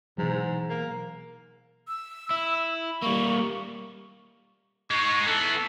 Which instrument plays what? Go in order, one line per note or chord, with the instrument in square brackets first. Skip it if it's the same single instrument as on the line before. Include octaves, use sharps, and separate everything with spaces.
[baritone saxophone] G#2 [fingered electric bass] B2 E3 F#3
[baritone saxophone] A#3
[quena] E6
[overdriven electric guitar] E4
[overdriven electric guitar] G3 A#3 [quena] C#6
[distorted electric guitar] G#3 D#4 [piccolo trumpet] C#6
[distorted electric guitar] E3 B3 [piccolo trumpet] A4